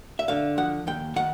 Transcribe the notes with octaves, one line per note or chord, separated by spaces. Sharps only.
E5
D3 F5
F3 F#5
D#2 G5
D#3 F#5